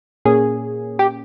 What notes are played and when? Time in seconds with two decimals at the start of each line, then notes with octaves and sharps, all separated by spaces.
0.25 A#2 A#3 C#4 G#4
0.99 G4